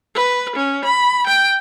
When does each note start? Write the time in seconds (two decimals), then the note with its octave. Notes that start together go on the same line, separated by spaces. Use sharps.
0.15 B4
0.56 C#4
0.85 B5
1.27 G5